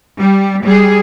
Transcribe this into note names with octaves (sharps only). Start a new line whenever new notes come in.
G3
G3 G#4